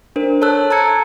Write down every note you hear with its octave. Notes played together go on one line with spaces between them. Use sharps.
D4 A#4 C5
A4 C#5 A5 E6 F#6
A5 A#5 E6 G#6 C#7